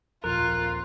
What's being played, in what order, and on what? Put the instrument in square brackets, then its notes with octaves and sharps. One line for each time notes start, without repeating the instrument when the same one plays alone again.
[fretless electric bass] D#1 A#1 F2 [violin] F4 [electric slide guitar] A#4 [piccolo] F#6